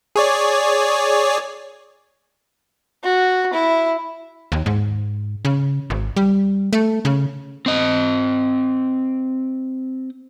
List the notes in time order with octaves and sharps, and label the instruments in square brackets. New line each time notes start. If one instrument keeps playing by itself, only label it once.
[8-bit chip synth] G#4 C#5 D5
[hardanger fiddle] F#4
E4
[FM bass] D#2
G#2
C#3
G#1
G3
A3
C#3
[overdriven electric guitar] C4 D#5